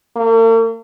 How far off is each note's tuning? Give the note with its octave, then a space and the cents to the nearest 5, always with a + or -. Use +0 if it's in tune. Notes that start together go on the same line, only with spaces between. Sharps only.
A#3 -45